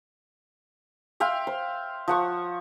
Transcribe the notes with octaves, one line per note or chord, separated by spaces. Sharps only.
E5 F5 G5 C6
C5
F3 F#5 C#6